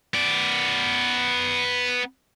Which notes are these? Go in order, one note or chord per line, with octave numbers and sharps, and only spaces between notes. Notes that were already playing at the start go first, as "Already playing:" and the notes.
B3 D5